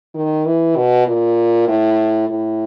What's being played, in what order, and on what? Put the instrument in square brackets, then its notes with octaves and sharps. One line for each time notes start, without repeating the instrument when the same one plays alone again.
[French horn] D#3
E3
B2
A#2
A2
A2